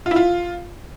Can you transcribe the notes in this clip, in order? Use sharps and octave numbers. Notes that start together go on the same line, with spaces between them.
F4
E4
F4